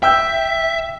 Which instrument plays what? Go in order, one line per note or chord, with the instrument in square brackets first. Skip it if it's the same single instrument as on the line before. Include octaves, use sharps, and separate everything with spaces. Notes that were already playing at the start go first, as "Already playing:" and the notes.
[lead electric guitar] E5 [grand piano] G5 E6 G6